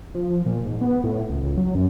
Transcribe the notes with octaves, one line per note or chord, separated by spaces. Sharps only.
F3
A#2
G#2
B3
A2
C#2
C#2
F#3
F#2